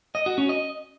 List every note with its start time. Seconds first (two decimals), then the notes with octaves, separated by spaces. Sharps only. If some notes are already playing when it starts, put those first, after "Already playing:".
0.15 D#5
0.26 F#4
0.38 C#4
0.49 D#5